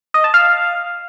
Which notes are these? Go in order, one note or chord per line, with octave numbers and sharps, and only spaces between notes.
D#5
A5
F5